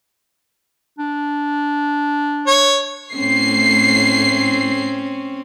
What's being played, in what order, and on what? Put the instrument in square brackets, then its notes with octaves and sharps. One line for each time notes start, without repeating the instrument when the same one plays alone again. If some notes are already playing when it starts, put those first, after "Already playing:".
[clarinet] D4
[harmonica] C#5
[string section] A2 C7 [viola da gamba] C4 C#4